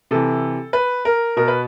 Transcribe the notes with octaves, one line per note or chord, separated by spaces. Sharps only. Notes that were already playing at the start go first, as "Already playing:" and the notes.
C3 E3 A4
B4
A#4
B2 A#4
B4